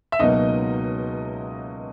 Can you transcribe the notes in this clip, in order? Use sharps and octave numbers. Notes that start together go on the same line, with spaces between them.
E5
C#2 B2 F#3 A#3 D#4 D#5